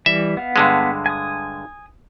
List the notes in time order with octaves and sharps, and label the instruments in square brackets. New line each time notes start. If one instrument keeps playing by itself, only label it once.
[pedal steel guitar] E3 G3 [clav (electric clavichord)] E5
[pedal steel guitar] B3 F5
[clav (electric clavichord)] G2 D3 G#3
[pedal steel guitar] G#5 D#6